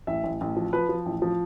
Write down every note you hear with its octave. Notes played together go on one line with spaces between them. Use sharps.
A1 E5
A1
A1
F3
F3 B4
F3
A1
F3